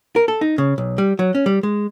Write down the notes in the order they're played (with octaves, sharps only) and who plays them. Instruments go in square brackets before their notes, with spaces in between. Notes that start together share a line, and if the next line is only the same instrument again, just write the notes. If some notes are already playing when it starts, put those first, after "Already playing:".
[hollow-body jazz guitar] A#4
A4
D#4
C#3
B1
G3
F#3
C#4
G3
G#3